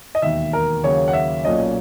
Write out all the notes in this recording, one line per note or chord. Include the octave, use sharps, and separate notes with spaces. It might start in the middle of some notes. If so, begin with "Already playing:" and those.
D#5
E1 D#2 D#3 E5
A#4
D#2 C#3 F#3 A#3 C#4 C#5
F#5
E5
B1 A#2 A#3 C#4 D#5